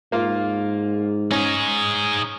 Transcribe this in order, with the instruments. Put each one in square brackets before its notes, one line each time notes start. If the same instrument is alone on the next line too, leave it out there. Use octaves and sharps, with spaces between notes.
[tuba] G#2 [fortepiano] A#3 F4
[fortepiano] C#4 [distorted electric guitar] D#4 G#4